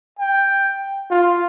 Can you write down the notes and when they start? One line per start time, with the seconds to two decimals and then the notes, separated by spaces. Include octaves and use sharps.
0.19 G5
1.11 F4